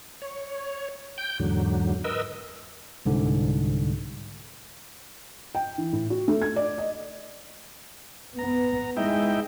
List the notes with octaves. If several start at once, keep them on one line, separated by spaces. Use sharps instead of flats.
C#5
G5 G6
E2 G#2 D3 F#3
A#4 B4 D#5 E6
C2 G#2 D3
G5
E3
A2
F#4
A3
G#6
D5
D#5
B3 A#5
G#3 D#4 E4 G5